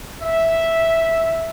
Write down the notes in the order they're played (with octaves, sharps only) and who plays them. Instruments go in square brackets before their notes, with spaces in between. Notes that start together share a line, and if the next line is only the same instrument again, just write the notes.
[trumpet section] E5